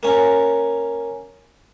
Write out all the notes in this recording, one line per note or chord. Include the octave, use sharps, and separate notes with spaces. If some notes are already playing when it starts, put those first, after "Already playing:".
A#3 C#4